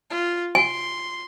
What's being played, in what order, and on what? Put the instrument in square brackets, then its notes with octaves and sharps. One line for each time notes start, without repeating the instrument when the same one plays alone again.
[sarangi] F4
[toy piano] G#5 [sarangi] C6